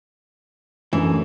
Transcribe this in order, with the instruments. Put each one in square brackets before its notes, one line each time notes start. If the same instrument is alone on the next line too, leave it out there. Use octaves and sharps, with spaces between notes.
[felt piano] F#2 A2 D4 [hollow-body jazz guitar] E3